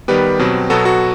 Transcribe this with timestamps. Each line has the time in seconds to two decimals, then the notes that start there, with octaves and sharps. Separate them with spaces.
0.08 D#3 G3 B3 G4 B4
0.39 B2 F#3 C4
0.70 B2 F#3 B3 F#4 A4
0.85 F#4 A4